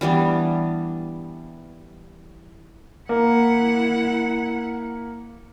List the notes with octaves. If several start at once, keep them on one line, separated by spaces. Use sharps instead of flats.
E3 G3 B3 D4
A#3 E4 F#5